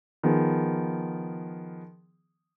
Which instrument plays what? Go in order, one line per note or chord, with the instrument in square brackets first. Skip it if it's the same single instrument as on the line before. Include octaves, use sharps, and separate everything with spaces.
[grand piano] D#3 F3 B3 G#4